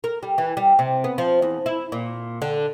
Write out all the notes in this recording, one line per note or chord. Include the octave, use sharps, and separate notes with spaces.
A#4
G3
E3
G3
C3
B3
F3
E2
E4
A#2
D3